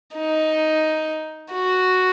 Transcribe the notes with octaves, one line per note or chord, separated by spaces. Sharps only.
D#4
F#4